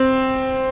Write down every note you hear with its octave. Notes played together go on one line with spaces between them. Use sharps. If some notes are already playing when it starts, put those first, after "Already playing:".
Already playing: C4